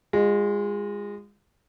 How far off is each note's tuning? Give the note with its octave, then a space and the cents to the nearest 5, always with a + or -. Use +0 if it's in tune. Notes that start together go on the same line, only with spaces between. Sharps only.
G#3 -25 F4 +15